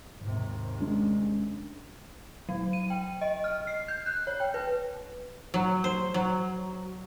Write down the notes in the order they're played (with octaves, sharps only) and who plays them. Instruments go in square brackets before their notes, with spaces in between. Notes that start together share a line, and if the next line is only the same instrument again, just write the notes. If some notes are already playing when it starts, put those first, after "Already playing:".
[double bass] D#2 C3 [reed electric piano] G#2
[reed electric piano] G#3 C#4 D4
[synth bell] F#3
D#7
G5
D#5
F6
C7
G6
F#6
C#5
G5
B4
[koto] F#3
C5
F#3